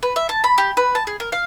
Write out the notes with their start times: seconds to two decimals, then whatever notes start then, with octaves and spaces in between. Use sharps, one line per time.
0.03 B4
0.16 E5
0.29 A5
0.44 B5
0.58 G4
0.77 B4
0.95 A5
1.07 G#4
1.20 A#4
1.32 F5